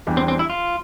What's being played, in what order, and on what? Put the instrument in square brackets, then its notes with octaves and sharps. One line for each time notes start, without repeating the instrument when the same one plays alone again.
[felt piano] E2 E3 G3 D4 G4
[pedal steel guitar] C4
C4
E4
F4